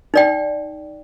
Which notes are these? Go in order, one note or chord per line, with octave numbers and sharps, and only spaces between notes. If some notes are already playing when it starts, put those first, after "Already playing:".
D#4 D5 G5